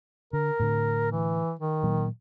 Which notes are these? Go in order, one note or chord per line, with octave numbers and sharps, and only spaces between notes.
D3 A#4
A2 D3
E3
D#3
A#2 F#3 A#3